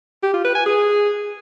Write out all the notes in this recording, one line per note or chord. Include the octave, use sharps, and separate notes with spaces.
G4
F4
B4
G#5
G#4